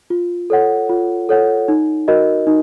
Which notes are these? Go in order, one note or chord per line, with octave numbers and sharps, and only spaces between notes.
F4
A4 C#5 F#5
F4
A4 C#5 F#5
D#4
F#4 A#4 D#5
D#4